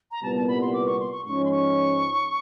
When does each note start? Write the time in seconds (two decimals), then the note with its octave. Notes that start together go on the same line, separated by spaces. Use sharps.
0.11 A#5
0.22 C2 A#2 G3 B3 A5
0.36 A5
0.48 B5
0.61 C6
0.73 D6
0.86 C#6
1.00 C6
1.12 C#6
1.25 G#2 F3 G#3 C#4 C#6
1.45 C6
1.51 C#6